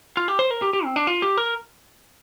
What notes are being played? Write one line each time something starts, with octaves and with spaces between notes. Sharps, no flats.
F4
G4
C5
A#4
G4
G4
C4
D4
F4
G4
A#4